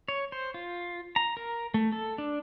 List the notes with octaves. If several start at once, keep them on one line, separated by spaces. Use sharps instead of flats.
C#5
C5
F4
A#5
A#4
A3
A4
D4